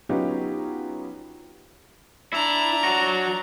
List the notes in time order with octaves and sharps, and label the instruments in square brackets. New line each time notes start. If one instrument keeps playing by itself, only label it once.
[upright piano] F#3 B3 C#4 D#4 F4 G4
[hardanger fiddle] D4 A#5 [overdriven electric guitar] E4
[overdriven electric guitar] F#3 F#4